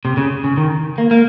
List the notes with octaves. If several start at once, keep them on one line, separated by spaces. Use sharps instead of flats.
C3
C#3
C#3
D#3
A#3
A#3